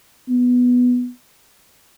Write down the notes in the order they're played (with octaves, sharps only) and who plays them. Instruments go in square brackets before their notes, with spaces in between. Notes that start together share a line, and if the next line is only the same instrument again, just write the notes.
[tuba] B3